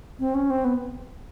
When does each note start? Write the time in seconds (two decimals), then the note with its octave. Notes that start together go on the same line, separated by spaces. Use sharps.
0.20 C4
0.34 C#4
0.50 C4
0.65 B3